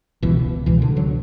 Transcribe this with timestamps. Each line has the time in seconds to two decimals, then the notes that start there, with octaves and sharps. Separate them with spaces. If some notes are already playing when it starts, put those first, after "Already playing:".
0.22 C#2 B2 E3
0.66 C#2 B2 E3
0.82 D3
0.96 D3 F#3